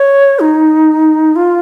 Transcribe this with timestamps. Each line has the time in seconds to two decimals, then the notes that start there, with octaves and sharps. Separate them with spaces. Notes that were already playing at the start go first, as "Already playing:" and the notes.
Already playing: C#5
0.40 D#4
1.36 F4